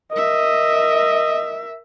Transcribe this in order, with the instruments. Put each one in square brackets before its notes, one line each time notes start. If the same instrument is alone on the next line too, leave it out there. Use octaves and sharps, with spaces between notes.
[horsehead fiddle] A#4 E5 [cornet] D#5